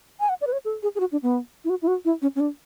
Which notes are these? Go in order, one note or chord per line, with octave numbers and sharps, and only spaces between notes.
G#5
F#5
D5
B4
C#5
A4
G#4
G#4
F#4
D4
B3
E4
F#4
E4
F#4
E4
C#4
C#4
D4